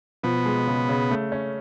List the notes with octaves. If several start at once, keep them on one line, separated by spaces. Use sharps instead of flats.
B2 F3 B3
G#3
C#3
C#3
A3
C#4